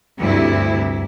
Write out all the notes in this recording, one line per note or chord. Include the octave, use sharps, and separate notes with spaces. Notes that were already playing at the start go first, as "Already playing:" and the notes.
D2 G2 C3 E4